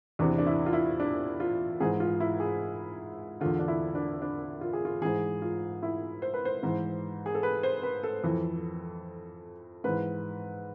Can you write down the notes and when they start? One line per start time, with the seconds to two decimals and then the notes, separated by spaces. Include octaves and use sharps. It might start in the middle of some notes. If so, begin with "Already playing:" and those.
0.19 E2 C3 E3 D4
0.38 D4
0.46 E4
0.66 F4
0.73 E4
1.00 D4
1.40 F4
1.80 G#2 E3 G#4
2.00 F4
2.20 E4
2.40 G#4
3.41 D3 F4
3.45 E2
3.59 D4
3.68 E4
3.95 D4
4.22 D4
4.61 F4
4.73 G#4
4.85 F4
5.02 G#2 E3 G#4
5.42 F4
5.83 E4
6.22 C5
6.34 B4
6.45 C5
6.63 G#2 E3
7.26 G#4
7.35 A4
7.43 B4
7.63 C5
7.83 B4
8.03 A4
8.24 F2 E3
9.84 G#2 E3 B4